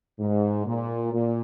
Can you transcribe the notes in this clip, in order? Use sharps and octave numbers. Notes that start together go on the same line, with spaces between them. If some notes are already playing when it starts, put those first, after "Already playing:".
G#2
A#2
A#2